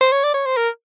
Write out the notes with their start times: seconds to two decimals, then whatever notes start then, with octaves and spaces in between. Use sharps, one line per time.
0.01 C5
0.12 C#5
0.24 D5
0.34 C#5
0.46 C5
0.57 A#4